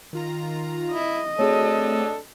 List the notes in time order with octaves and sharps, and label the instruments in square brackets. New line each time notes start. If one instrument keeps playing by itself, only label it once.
[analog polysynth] D#3 F4 A#5
[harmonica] E4 [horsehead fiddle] D#5
[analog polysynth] A3 C4 F#4 [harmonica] D4 A4 [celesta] G#4 C#5